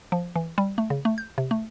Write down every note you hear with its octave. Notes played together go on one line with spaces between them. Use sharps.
F3
E3
G3
A3
C#3
A3
G6
C3
A3